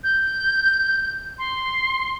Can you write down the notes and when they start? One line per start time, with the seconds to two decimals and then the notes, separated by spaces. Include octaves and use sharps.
0.04 G6
1.38 C6